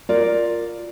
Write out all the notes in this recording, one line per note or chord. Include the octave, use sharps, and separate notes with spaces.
F4 A#4 D5